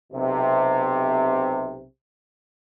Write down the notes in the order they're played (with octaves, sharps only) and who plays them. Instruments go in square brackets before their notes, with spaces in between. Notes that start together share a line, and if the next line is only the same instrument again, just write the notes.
[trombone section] B1 C3